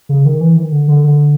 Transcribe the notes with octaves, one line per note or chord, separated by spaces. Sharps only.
C#3
D#3
E3
D#3
D3
D3
D3